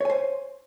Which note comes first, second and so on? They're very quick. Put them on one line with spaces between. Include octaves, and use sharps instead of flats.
C#5 G#5 C5